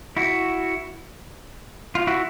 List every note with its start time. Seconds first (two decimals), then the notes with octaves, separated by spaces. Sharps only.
0.17 E4 F#4
1.95 F4
2.07 E4 F#4